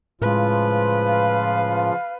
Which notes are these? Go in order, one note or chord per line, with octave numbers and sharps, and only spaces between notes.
A2 C#3 F3 G#3 F4 B4
F5